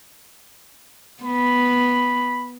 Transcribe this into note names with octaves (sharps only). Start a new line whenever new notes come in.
B3 B5